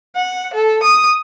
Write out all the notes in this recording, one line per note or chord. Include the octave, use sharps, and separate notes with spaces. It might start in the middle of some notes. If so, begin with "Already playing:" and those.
F#5
A4
D#6